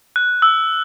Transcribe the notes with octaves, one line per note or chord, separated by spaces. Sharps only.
F#6
E6